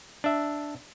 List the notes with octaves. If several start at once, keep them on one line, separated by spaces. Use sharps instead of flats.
D4 E5